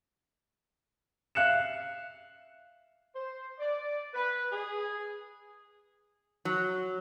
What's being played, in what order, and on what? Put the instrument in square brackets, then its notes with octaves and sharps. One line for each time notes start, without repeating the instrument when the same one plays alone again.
[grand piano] E5 F5 F#6 C#7 E7
[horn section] C5
D5
B4
G#4
[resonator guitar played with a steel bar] F#3